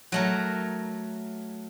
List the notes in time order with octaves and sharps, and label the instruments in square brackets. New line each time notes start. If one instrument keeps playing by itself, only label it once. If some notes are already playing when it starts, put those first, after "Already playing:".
[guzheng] F#3 A3 A#4